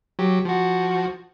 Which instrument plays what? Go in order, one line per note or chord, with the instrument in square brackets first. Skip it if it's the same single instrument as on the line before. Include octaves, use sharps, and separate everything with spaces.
[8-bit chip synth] F#3 G4
F3 F#4